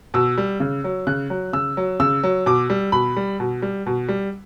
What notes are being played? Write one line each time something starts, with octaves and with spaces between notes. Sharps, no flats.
B2 E6
G3
C#3
F#3
C#3 F#6
F#3
C#3 E6
F#3
C#3 E6
F#3
B2 D6
G3
B2 B5
G3
B2
G3
B2
G3